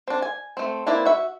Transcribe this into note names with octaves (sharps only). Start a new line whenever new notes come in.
C4 D4
G#5
A3 C4
A#3 C4 E4 B4 D5
F#4 E5